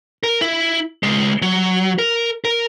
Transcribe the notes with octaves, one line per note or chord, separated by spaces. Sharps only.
A#4
E4
C#2 G#3
F#3
A#4
A#4